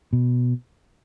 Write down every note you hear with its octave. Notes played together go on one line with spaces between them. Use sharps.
B2